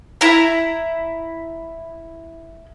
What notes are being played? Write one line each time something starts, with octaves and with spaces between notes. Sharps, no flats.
E4 A#5